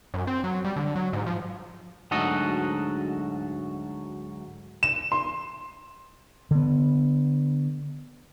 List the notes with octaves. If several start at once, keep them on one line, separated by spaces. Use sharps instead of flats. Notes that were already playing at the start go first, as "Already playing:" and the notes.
F#2
C4
F#3
G3
D3
F#3
G#2
F3
D2 G#2 F#3 F#4 A4 D#5
E7
C6
D3 B3